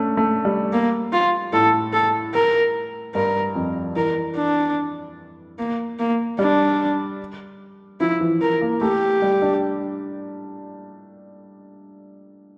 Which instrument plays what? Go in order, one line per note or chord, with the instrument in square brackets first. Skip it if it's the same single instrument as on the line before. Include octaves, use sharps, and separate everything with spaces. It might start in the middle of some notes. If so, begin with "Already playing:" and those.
Already playing: [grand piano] A3 C#4 D4
A3
G3
[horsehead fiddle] A#3
F4
[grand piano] A2 [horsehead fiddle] A4
[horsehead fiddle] A4
A#4
[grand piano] G2 [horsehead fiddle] A#4
[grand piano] F2
[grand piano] E3 [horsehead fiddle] A#4
[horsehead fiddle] D4
A#3
A#3
[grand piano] G3 [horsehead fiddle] D4
[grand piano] F3 [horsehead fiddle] E4
[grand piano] E3
[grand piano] E3 [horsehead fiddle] A#4
[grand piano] A#3
[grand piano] A3 [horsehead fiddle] G4
[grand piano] G3
D4